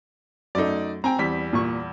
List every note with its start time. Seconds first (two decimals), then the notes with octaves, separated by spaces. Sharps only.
0.55 F#2 A3 D#4 D5
1.04 C4 G5 G#5 A#5
1.19 E2 G3 B6
1.53 A#2 C#6